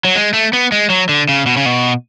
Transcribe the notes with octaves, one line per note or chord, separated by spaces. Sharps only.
F#3
G#3
A3
B3
G#3
F#3
D3
C#3
B2
C#3
B2